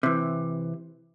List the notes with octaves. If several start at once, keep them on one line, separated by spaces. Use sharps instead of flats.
C3 E3